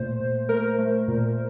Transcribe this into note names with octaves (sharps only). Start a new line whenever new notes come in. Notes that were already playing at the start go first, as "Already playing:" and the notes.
Already playing: A#2 A3 C5
A#2
A3 A#4
A3
A#2